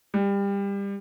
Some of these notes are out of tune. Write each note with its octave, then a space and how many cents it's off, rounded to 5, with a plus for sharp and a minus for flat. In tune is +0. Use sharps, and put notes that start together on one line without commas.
G3 +25